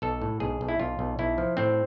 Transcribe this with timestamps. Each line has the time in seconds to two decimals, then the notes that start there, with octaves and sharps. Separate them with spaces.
0.02 B1 A4
0.21 A2
0.40 B1 G#4
0.61 B1
0.68 E4
0.80 B1 F4
0.99 B1
1.19 B1 E4
1.38 F3
1.57 A2 C4